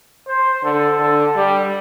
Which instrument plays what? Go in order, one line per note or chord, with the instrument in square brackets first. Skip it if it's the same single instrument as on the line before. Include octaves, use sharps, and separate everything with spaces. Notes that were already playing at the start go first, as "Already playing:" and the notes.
[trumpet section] C5
[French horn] D3 [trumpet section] A4
[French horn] D3 [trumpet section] A4
[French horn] G3 [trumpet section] G4